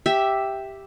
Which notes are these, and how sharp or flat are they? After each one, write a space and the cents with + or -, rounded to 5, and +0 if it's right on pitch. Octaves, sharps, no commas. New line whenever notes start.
G4 +0 E5 +0